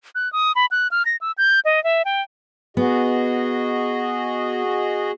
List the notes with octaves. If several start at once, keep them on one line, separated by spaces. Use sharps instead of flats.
F#6
D#6
B5
F#6
F6
A#6
E6
G6
D#5
E5
G5
B3 F#4 G#4 D#5